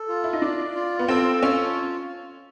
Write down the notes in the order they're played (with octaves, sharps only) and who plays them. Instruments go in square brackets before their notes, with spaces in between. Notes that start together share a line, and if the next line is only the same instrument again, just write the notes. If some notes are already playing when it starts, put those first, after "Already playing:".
Already playing: [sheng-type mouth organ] A4
F4
[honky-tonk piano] E4
D#4
[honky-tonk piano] D4 [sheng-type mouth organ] D5
[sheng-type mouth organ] F4
[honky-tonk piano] B3
[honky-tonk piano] C4 [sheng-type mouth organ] A4
[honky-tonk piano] C#4 [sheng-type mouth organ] F4